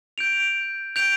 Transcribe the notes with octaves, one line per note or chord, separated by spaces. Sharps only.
G6 D7 F7
G6 D7 F7